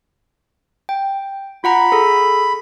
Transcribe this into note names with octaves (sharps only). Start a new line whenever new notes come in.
G5
F4 F#5 A#5 B5
G#4 A4 B6